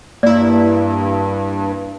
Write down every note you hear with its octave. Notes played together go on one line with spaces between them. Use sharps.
G2 A#3 E4 D5